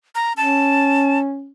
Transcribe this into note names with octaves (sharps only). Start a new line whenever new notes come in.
A#5
C#4 A5